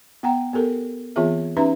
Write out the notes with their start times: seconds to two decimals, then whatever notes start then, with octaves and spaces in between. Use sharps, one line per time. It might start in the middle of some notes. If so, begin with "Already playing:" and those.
0.23 B3 F#5 G5 A#5
0.53 B3 G4 A4 A#4
1.16 E3 B3 C4 F4 G#4 E5
1.57 C#4 D#4 G4 B4 E5 A#5